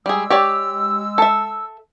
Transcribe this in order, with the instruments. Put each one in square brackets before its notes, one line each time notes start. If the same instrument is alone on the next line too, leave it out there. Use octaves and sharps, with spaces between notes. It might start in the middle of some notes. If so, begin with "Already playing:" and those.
[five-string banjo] G3 G#4 [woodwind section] G#3 E6
[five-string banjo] G4 C#5 D5
A4 E5